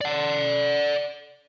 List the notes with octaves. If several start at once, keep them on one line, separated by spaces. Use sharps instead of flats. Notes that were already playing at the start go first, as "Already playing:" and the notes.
D5 F#5